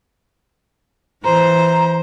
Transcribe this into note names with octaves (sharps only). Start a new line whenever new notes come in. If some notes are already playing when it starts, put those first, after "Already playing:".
E3 C5 A#5